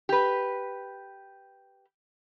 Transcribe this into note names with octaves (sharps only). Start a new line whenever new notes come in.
G4 B4